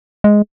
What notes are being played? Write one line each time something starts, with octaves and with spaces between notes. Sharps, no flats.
G#3